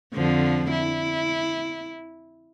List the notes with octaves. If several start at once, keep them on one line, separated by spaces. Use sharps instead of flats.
F2 D3 F3
E4